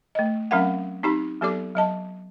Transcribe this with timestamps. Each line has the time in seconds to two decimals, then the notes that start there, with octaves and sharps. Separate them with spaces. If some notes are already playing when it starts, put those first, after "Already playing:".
0.15 A3 D#5
0.51 F#3 C4 C#4 A#4 F5 F#5
1.03 C4 D#4 G4 B5
1.41 F#3 B3 G4 A4 D5 D6
1.75 F#3 D#5 A5